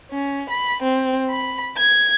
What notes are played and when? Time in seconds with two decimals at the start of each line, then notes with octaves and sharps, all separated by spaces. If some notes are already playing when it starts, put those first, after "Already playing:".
0.12 C#4
0.50 B5
0.83 C4
1.30 B5
1.77 G#6